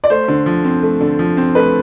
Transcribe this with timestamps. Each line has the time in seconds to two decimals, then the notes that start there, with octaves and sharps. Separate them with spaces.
0.04 D5
0.10 A3 C5
0.28 D3
0.46 F3
0.65 C4
0.83 A3
1.01 D3
1.19 F3
1.37 C4
1.55 A3 B4